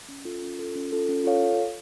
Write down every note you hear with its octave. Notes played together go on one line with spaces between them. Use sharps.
C#4
F4 A4
C#4
F4 A4
C#4
F4 A4
C#4
F4 A4 C#5 F5